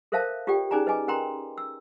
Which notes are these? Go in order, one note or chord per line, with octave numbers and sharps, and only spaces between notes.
A4 A#4 C5 E5 F5 A5
F4 G4 A4 D5 G5
C#4 D#4 G#4 D5 G#5 A#5
B4 D#5 G#5 D6
C#4 A#4 G5 A#5 C6
E6